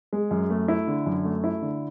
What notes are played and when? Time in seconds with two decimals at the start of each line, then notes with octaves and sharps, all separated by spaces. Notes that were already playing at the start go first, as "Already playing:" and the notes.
0.13 G#3
0.31 F#2
0.50 A3
0.68 E4
0.87 D3
1.06 F#2
1.25 A3
1.44 E4
1.62 D3